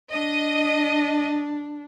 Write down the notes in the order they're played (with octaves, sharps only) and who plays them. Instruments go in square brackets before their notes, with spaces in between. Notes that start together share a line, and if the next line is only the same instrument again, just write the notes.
[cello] D4 [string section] D#5